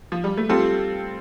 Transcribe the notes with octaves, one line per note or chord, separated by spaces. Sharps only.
F3
G3
A3
G3 C4 F4 A4